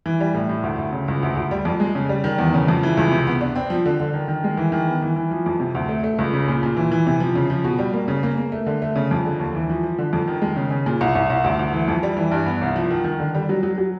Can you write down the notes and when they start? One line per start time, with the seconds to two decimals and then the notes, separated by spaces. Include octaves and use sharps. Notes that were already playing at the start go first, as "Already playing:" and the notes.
0.06 E3
0.20 G3
0.34 A2
0.49 A2
0.63 D2
0.78 D2
0.93 C#3
1.08 C#2
1.23 D2
1.36 D2
1.51 G3
1.65 F2
1.80 G#3
1.95 C#3
2.09 G3
2.24 D#3
2.38 E2
2.54 C#3
2.68 F2
2.83 E3
2.97 C#2
3.11 C3
3.27 B3
3.41 D4
3.56 C4
3.70 F3
3.86 D3
4.00 D3
4.14 D#3
4.28 D#3
4.44 G#3
4.57 E3
4.72 D#3
4.87 B3
5.02 E3
5.16 E3
5.31 F3
5.46 F2
5.60 C3
5.75 D2
5.89 A3
6.04 A3
6.19 C#2
6.33 C#3
6.48 A#2
6.63 A#2
6.77 E3
6.92 E3
7.07 C3
7.20 F3
7.35 C#3
7.50 F3
7.64 B2
7.79 G3
7.93 A#3
8.08 C#3
8.23 A#3
8.38 A#3
8.52 A3
8.67 D3
8.82 A3
8.96 C#3
9.11 F2
9.25 D3
9.40 D#2
9.55 E3
9.70 F3
9.83 F3
9.98 D3
10.13 F2
10.28 D#3
10.42 G#3
10.56 C#3
10.71 C#3
10.86 A#2
11.01 C2
11.15 C2
11.30 C2
11.44 D2
11.59 D2
11.73 E3
11.88 F2
12.03 G3
12.17 E3
12.32 G2
12.46 B3
12.62 C2
12.76 F3
12.91 D#3
13.04 D#3
13.20 D3
13.35 G3
13.49 F#3
13.63 F#3
13.78 F#3